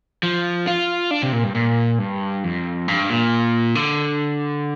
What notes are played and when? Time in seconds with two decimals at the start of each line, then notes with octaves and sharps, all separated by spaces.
0.23 F3
0.67 F4
1.11 D4
1.23 C3
1.32 A#2
1.44 G2
1.55 A#2
1.99 G2
2.44 F2
2.88 G2
3.10 A#2
3.75 D3